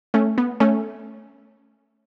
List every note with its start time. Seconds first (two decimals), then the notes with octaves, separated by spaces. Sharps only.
0.14 A3 C#4
0.38 B3
0.60 A3 C#4